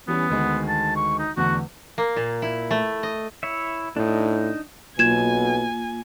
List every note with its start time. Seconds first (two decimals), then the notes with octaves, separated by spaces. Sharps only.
0.08 E3 G3 B3 C#4
0.30 D2 D#3 G#3
0.68 A5
0.96 C#6
1.19 D#4
1.37 E2 D3 A3 F#4
1.98 A#3
2.16 A#2
2.42 E4
2.71 A3
3.03 D#5
3.43 E4 C#5 E5
3.96 A2 D4 D#4
4.99 B1 B2 A#3 F4 G#5 G#6 E7